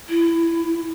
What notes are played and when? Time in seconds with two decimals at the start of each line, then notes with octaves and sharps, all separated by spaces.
0.08 E4